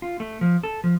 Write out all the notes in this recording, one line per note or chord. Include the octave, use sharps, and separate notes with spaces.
F4
A3
F3
A4
F3